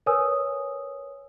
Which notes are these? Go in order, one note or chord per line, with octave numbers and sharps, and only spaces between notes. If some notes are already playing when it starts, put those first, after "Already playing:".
A#4 B4 C#5 G#5 D#6 E6